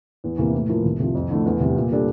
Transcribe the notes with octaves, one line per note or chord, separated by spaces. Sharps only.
E2
C3 E3 A#3 E4
A2
F3 A#3 E4 A#4
C2
C3 F3
F2
D3 A3 E4
E2
C3 G3
A#2
G3 D4 A4